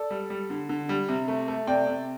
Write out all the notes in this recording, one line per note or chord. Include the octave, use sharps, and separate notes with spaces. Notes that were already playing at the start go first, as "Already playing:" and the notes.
Already playing: A4 D5
G3
G3
D3
D3
G3
C3
A3
A3
C3 D5 G5
C3